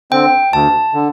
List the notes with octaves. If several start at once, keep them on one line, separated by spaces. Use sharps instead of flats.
D3 C4 G5
D2 A5
D3